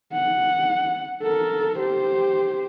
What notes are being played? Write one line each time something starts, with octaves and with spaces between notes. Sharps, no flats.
F#5
A4 A#4
G4 C5